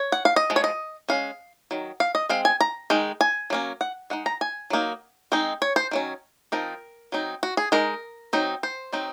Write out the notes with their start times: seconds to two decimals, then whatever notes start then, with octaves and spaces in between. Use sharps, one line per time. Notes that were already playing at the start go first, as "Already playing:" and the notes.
Already playing: C#5
0.12 F#5
0.25 F5
0.36 D#5
0.50 F3 G#3
0.56 C#5
0.64 D#5
1.09 G#3 C#4 F5
1.71 D#3 F#3
2.00 F5
2.15 D#5
2.29 G#3 C4 F5
2.45 G#5
2.61 A#5
2.90 D#3 G#3 D#4
3.21 G#5
3.50 F#3 A#3 C#4
3.81 F#5
4.10 G#3 D#4 F#5
4.26 A#5
4.41 G#5
4.70 F#3 A#3 D#4
5.32 G#3 C4 D#4
5.62 C#5
5.76 C5
5.91 D#3 F#3 C#4
6.52 F3 C4 D#4 A#4
7.12 F#3 C4 D#4
7.43 F#4
7.57 G#4
7.72 G#3 D#4 A#4
8.33 F#3 C4 D#4
8.63 C5
8.93 D#3 F#3 C4 D#4